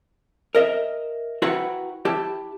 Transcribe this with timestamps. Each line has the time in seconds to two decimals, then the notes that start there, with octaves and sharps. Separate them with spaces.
0.55 A#4 D#5 E5
1.42 E4 F#4 B4 F#5 G5 A#5
2.05 E4 G4 A5